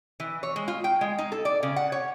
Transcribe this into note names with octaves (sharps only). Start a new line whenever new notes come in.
E3
C#5
G#3
F4
G5
G#3
D#4
A4
D5
C#3
F#5
C#5